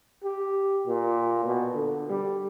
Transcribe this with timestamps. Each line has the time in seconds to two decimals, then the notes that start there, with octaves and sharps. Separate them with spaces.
0.24 G4
0.86 A#2
1.45 B2
1.74 D3
2.09 G3